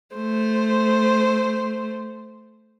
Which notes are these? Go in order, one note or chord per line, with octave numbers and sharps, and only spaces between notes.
A3 C5